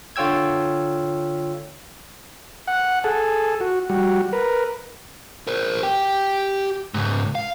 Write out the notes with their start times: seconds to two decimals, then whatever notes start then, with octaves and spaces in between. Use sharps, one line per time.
0.16 D3 F4 C#5 G5 E6 G#6
2.67 F#5
3.04 G#4 A4
3.60 F#4
3.89 G3 F#4
4.33 A#4 B4
5.47 A#4 C5
5.83 G4 G5
6.94 C#2 G#2
7.35 F5